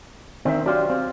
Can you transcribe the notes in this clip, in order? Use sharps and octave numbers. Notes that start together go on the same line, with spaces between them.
D#3 C4 E5
F#3 D4 F4 G4 C5
C4 F4